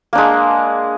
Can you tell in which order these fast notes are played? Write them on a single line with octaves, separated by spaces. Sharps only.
A#3 D4 G#3